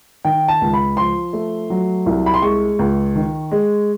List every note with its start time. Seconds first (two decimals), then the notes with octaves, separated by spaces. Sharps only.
0.25 D#3 G5
0.48 A5
0.61 C#2
0.73 B5
0.97 F3 C6
1.33 A3
1.70 F#3
2.06 C2
2.26 B5
2.34 C6
2.42 G#3 C#6
2.79 C#2
3.16 D#3
3.51 G#3